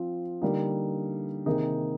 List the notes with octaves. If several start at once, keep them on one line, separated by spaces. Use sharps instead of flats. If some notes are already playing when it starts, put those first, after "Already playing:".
Already playing: F3 C4 F4
D3 G3 A#3 D#4
C3 D#3 A#3 D#4 G#4